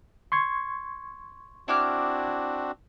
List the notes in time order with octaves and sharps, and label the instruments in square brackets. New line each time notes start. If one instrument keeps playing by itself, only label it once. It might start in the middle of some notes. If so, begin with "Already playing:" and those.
[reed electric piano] C6 C#6 G#6
[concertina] C4 D4 F#4 [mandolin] E4 D6 F6